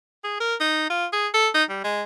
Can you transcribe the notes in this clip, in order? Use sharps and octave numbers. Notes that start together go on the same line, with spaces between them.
G#4
A#4
D#4
F4
G#4
A4
D#4
G3
G#3